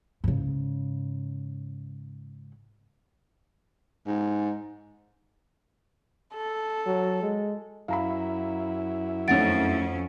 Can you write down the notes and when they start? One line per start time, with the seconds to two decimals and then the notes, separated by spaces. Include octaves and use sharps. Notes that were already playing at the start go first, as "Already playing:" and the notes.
0.24 G#2 C#3
4.07 G#2
6.36 A4
6.86 F#3
7.23 G#3
7.88 F#2 E4 F5 A#5 B5
9.28 F2 D#3 A3 C#4 F#5 A6 D7